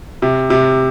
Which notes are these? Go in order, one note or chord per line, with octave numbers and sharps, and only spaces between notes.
C3
C3